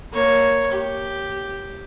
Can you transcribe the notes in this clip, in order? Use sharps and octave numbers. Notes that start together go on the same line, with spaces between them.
A#3 C#5
G4